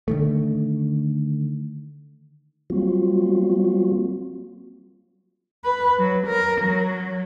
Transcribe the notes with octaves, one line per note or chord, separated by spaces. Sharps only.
D3 D#3 A3
F#3 G3 A#3 C4 F4 F#4
B4
F#3
A#4
F#3